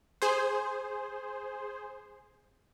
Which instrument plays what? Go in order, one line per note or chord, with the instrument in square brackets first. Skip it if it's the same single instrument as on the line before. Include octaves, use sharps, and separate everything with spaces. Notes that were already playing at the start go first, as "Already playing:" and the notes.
[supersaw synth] G#4 C5